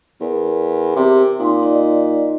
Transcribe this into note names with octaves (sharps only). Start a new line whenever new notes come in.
E2 A#4
C3
A#2 D#4 C6
D#4 D5 D#5